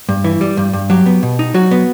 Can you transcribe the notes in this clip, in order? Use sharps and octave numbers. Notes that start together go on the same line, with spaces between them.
G2
E3
G3
G2
G2
F#3 G4
B3
B2
D#4
F#3 F#4
B3